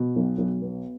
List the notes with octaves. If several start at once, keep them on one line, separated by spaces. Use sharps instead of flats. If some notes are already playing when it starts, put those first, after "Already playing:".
Already playing: B2
B1
B1
B3